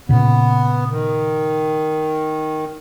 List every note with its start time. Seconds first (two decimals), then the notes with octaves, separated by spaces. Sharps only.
0.09 A#2 C#3 B3
0.90 D#3